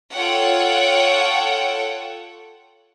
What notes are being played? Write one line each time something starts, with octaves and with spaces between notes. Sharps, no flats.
F4 A4 C#5 F#5 G5